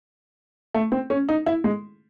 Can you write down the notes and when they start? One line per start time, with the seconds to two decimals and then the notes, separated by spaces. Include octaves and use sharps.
0.74 A3
0.92 C4
1.10 C#4
1.29 D#4
1.46 E4
1.64 G#3